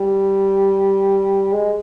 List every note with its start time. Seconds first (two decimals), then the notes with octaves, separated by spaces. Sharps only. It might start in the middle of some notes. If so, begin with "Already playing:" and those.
Already playing: G3
1.53 G#3